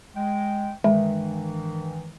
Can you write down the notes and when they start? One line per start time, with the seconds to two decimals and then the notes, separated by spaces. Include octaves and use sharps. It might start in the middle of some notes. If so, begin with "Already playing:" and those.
0.16 G#3 G5
0.84 G2 D#3 E3 G#3